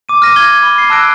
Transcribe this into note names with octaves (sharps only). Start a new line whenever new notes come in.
D6 D#7
F6 A#6 D#7
G#6 G7
B5
C7
A5 E6 F#6 A#6 D7